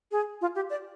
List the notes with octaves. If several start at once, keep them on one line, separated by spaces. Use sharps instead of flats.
G#4
F4
G4
D5